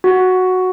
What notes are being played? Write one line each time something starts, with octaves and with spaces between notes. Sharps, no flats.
F#4